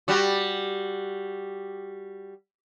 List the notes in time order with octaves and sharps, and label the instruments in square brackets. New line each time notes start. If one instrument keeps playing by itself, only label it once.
[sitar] G3 F#4